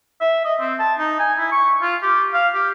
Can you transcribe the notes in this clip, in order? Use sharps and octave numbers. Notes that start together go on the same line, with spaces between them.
E5
D#5
C4
A5
D#4
G#5
E4
C#6
F4
G4
F5
G4